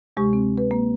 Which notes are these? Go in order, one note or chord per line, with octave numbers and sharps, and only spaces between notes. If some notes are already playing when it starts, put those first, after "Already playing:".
D2 C3 G#3 G4 C#6
C4
B4
A#3